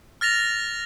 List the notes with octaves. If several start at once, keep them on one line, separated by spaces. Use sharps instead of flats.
F6 A6 A#6 F7